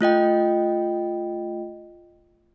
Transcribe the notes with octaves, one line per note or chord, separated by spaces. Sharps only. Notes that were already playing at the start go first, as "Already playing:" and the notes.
A3 F4 D#5 G5